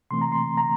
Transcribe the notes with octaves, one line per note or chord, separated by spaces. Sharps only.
C3 E3 A3 C4 C6
A#5
C6
A#5